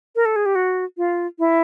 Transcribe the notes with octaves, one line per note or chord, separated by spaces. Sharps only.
A#4
A4
G#4
G4
F#4
F4
E4